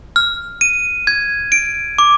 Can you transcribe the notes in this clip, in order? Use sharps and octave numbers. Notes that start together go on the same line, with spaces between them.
F6
D#7
G#6
D7
D6